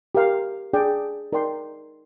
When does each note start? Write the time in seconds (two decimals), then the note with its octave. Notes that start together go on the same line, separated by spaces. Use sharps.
0.15 G4 A#4 F5
0.73 D4 G#4 D5 G5
1.32 D#4 A#4 D5 G5 C6